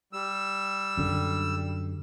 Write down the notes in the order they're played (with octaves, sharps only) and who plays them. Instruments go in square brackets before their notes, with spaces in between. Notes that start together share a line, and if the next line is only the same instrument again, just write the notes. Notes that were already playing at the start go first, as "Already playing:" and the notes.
[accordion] G3 E6
[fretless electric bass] F#2 D3